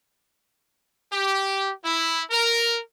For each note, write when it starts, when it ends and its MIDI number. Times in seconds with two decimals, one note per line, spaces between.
1.12 1.72 67
1.84 2.23 64
2.31 2.80 70